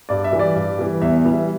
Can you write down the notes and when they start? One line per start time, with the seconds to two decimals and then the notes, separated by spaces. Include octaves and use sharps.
0.09 G2 D5
0.24 E5
0.33 E3 G3
0.39 D5
0.55 G2
0.79 E3 G3
1.02 E2 E5
1.25 E3 G3
1.32 E5